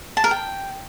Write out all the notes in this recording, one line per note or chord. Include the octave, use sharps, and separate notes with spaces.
A5
A#4
G5